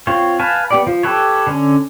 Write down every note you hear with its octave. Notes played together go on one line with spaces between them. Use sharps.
C4 F4 C#5
B4 F5 G#5 A5
B3 G4 D5
F3
G4 A4 B4 C#5
D3 C#4